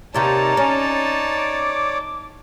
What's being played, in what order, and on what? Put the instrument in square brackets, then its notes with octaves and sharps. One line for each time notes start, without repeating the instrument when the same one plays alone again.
[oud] D#2 C3 D#3 [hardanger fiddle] D#4 A5 [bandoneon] C#5 D5 [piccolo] A#5
[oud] C#4
[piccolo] D6